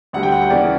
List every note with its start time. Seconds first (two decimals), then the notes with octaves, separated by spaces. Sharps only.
0.13 D2 D3 G3 F#5
0.23 G5
0.32 F#5
0.42 G5
0.50 C#3 E3 A#3 D5